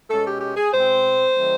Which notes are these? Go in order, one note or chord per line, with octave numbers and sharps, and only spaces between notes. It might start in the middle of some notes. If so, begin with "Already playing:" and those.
B2 G#3 C#4 A4
G4
G4
G#4
B2 G#3 C4 C5
D#3 F#3 A3 C4